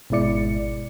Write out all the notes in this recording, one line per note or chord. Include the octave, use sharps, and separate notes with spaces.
G#1 B2 G#3 E4 D5 C#7